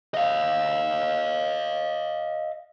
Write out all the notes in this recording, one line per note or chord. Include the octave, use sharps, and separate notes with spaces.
D#5 F5